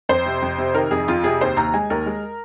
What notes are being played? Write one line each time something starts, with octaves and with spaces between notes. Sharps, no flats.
F2 C5
C3
F2
C3
D#3 A#4
F2 G#4
F2 F4
C3 G#4
D#2 C5
D#2 A#5
G#3 G#5
D#2 A#4
G#3